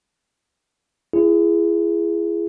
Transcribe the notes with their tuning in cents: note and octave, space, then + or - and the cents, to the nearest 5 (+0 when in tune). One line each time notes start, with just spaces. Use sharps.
E4 +40 G#4 +0